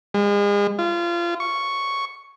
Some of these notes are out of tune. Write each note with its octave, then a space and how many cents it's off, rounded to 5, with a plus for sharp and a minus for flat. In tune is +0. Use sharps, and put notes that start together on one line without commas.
G#3 -35
F4 -25
C#6 +0